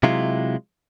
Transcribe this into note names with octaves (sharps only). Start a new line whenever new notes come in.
C3 F#3 G#3 E4 F4